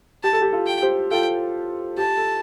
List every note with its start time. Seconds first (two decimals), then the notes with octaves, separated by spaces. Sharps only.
0.23 G4 A5
0.33 A4
0.42 G4
0.52 F4 A4
0.67 G5
0.82 G4 C5
1.11 F4 A4 G5
1.98 G4 A5
2.18 A4